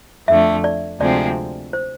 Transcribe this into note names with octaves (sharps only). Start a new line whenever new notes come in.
F2 D3 A3 E5
D5
D2 C3 F3 G#3 C4 D5
C5